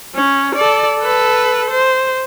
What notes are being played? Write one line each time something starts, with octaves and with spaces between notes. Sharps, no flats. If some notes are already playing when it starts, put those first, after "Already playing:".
C#4
A4 D5
A4 B4
C5